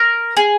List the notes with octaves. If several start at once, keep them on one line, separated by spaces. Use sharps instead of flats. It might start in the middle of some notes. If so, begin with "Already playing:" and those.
Already playing: A#4
G#4